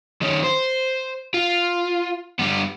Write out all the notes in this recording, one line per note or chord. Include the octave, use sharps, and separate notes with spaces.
D#3 C#4
C5
F4
G3 B3